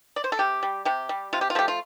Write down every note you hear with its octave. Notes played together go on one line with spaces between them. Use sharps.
D5
C5
A4
C3 G4
G3
C3 G4
G3
C3 F4
G4
F4
F3 A3 G4
F4